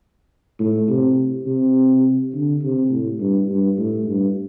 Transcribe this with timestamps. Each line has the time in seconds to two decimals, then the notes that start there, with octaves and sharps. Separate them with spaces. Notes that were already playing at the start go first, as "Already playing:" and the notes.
0.60 A2
0.89 C3
1.46 C3
2.34 D3
2.63 C3
2.91 A2
3.20 G2
3.49 G2
3.78 A2
4.07 G2